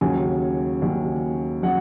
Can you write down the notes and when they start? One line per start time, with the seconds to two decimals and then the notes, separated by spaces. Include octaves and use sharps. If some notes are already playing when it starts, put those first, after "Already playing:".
0.01 D#2 C#3 F#3 G#5
0.82 D#2 C#3 F#3
1.63 C#3 F#3 F#5